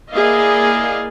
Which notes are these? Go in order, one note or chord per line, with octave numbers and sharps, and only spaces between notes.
A#3 E4 G#4 D5 D#5 F5